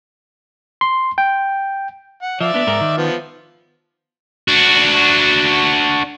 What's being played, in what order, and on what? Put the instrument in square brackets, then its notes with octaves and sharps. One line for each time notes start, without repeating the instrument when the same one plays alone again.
[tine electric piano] C6
G5
[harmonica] F#5
[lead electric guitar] F3 [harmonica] D5 E5
[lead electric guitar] B3 D4
G#2 A#4
D#3
[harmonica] F3 B3
[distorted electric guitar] D4 F#4